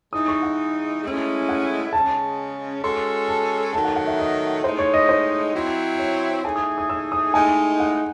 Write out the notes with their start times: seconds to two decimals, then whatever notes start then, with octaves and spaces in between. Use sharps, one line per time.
0.13 E3 G#3 D#4 D#6
0.28 C#6
0.43 F#5
1.03 A2 G#3 C#4 E4
1.49 F#5
1.93 C#3 G#3 C#4 A5
2.83 G#3 C#4 F#4 A4 C6
3.28 A5
3.73 D#3 F#3 A3 A5
3.85 F#5
3.96 F#5
4.07 E5
4.19 D#5
4.64 A2 G#3 D#4 C5
4.79 C#5
4.94 D#5
5.09 C5
5.54 F#3 C4 E4
5.99 C#5
6.44 E3 A3 D#4 G#4 G#5
6.56 D#6
6.78 D#6
6.90 E6
7.12 D#6
7.34 A2 G#3 D#4 G#5
7.80 F#5